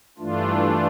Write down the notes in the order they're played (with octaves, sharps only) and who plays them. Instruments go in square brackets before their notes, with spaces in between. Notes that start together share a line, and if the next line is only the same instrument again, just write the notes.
[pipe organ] G2 E3 A3 D4 F4